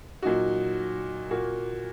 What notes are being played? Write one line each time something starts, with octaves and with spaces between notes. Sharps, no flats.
A#2 F#3 D#4 F#4
A#2 A#3 F#4